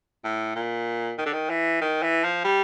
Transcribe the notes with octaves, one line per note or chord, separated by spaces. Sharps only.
A2
A#2
D#3
D3
D#3
E3
D#3
E3
F3
G3